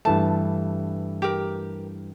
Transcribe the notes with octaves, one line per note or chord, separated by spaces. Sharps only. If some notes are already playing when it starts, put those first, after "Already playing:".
G2 E3 A3 A5
G4 A#4